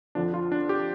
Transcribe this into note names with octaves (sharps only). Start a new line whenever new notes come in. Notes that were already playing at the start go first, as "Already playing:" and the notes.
F2 D3 F3 D4
F4
D4
G4